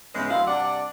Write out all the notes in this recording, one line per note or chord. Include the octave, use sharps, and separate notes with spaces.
G#2 C#3 E3 G#3 B3 C#4
D2 F#3 C4 E4 F5
G2 C3 D4 D5 F#5